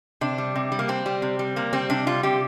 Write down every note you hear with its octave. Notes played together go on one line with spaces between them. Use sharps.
C3 D4
G3
C3
G3
A#3
C3 C4
G3
C3
G3
C3 A#3
G3 C4
C3 D4
G3 F4
C3 G4